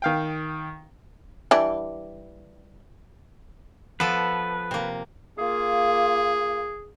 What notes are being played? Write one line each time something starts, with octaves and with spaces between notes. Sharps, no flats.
D#3 F5 G5
E3 G3 D4
F3 B3 A4 B4
C3 A#3
A#3 F4 G#4